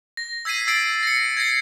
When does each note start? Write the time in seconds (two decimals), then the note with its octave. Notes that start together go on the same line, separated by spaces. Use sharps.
0.17 A#6
0.45 E6 G#6 B6 C7 D#7
0.67 E6 A6 C7 D7
1.03 A#6 C#7
1.37 G#6 A#6 C7